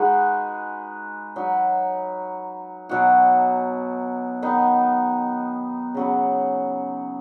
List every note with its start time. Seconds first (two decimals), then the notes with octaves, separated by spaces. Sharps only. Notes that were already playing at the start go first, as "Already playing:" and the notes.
Already playing: G#3 D#4 F#4 B4
1.36 F#3 D#4 B4
2.89 B2 F#3 D#4 F#4
4.42 D#3 B3 D#4
5.94 C#3 F#3 B3